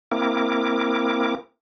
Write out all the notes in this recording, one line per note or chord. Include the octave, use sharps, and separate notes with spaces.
A#3 C4 E4 A#4 D6